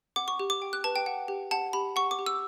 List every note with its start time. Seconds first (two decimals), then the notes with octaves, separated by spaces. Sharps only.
0.16 F#5 D6
0.28 C#6
0.40 G4
0.50 D6
0.62 G5
0.73 F#6
0.84 B4 A5
0.96 G5
1.06 F#5
1.28 G4
1.51 F#5 A5
1.73 G4 B5
1.96 F#5 C#6
2.11 D6
2.19 G4
2.26 E6